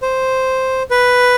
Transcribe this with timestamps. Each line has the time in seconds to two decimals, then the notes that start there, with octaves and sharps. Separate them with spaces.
0.02 C5
0.91 B4